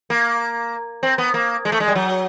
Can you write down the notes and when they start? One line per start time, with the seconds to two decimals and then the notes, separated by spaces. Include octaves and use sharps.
0.10 A#3
1.03 C4
1.18 B3
1.34 A#3
1.65 G#3
1.72 A3
1.80 G#3
1.88 G3
1.95 F#3